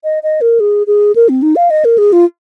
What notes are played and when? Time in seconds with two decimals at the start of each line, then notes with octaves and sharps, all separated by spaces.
0.04 D#5
0.23 D#5
0.41 A#4
0.60 G#4
0.87 G#4
1.15 A#4
1.29 C4
1.42 D#4
1.56 F5
1.70 D#5
1.85 A#4
1.98 G#4
2.12 F4